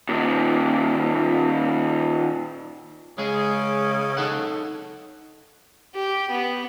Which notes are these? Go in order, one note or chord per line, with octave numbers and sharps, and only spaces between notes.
D#2 A#2
C#3 G#3 G#4
D#4 A4 F#5
G4
B3